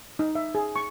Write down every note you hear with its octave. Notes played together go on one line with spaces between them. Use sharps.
D#4
E5
G#4
C#6